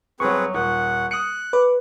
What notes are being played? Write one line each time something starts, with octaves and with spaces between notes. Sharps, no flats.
G1 F#3 C4 G#4 B4 C#6
D#1 F#5
D#6 F#6 C#7
B4 D6